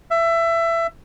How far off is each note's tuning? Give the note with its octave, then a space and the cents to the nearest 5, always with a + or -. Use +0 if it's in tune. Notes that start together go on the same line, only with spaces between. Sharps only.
E5 +20